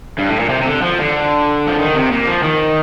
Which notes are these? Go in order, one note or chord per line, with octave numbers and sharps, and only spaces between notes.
G2
A2
A#2
C3
C3
D3
F3
D3
F3
D#3
C3
A#2
F3
D#3